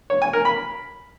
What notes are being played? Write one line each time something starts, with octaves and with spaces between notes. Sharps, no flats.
C#5
G#5
A#4
B5